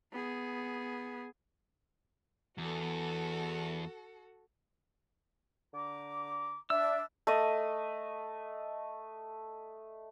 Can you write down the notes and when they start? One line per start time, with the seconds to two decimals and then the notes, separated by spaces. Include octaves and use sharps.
0.12 B3 G#4
2.58 E2 F#4 A4
5.74 D3 A#5 D6
6.70 D4 E5 E6
7.27 A3 D#5